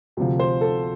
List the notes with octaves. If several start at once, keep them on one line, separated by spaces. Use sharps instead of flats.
D2 C3 F3
C5
A4